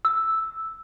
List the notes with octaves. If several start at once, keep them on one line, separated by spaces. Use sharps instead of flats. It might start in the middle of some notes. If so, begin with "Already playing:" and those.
E6